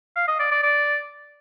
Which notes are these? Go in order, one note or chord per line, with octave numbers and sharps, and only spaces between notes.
F5
D#5
D5
D5
D5